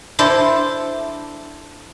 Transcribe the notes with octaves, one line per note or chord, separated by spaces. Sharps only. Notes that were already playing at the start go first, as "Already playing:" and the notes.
D4 E4 A4 C5